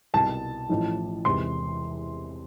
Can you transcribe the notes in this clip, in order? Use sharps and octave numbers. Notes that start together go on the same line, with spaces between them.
C2 B2 A5
A1 A2 F3
E1 E2 C3 E3 C6